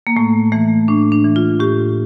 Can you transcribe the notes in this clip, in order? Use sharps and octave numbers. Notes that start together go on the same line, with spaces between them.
A#3
A2 A3
E3 A3
A2 D4
D4
E3
F4
A2 G4